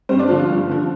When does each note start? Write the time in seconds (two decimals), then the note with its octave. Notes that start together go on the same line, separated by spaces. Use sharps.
0.09 G2 C4 C5
0.19 D4 D5
0.29 D3 F3 F4
0.39 F3 F4
0.50 G2
0.69 D3 F3